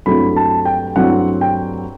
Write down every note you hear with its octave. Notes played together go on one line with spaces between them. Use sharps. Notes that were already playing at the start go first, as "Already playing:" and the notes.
G2 F#3 A3 C4 E4 B5
A5
G5
G2 F#3 A3 C4 E4 F#5
G5